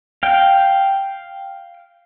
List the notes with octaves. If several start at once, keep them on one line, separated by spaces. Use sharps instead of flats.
F5 G5